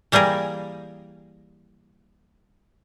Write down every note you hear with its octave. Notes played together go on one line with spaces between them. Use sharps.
E3 G3 A#3 G#4 A#4